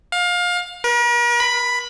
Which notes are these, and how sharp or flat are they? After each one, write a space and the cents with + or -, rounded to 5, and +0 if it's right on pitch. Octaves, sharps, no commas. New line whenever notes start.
F5 +25
A#4 +45
B5 +5